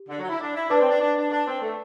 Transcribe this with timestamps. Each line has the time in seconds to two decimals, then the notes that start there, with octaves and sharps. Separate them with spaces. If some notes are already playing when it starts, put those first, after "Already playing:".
Already playing: G4
0.09 D3
0.19 F#3
0.29 E4
0.40 D4
0.55 E4
0.70 D4 B4 D5 A5 D6
0.80 C4
0.90 D4
1.00 D4
1.16 D4
1.31 D4
1.47 C4
1.62 A3